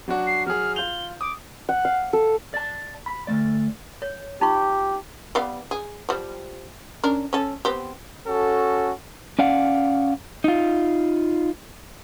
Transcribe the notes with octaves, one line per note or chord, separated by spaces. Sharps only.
F#3 D4 F#4
C7
F#3 G#4 F6
F4 G6 F7 G7
D6 D#6
F#5
F5
A4
D5 A5
B5
D2 B2 A3 D5
C#5
D#4 F4 G4 C#6
G3 B3 F5
G#4
F3 G3
C#4 D4 A#4
C#4 A4
B3 C4 G4
C#4 F#4 A4
C#4 D5 F5 F#5
D#4 F4